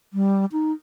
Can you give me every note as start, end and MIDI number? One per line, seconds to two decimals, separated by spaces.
0.13 0.45 55
0.52 0.72 63